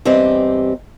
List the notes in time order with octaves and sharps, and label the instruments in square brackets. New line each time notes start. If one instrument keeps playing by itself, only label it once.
[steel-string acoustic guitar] E2 G2 C4 G4 D#5